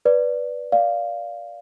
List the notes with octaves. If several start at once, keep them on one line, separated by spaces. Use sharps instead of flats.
B4 D5
D5 F5